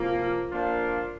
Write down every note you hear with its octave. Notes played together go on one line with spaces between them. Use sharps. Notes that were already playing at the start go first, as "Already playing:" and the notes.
Already playing: C3 F3 A#3 F4
F3 A#3 D4 F4